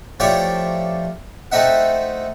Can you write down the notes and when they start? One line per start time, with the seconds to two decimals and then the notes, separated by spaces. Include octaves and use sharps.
0.20 F3 A3 E4 G4 C#5 D5
1.52 A3 C4 D#4 E5 F#5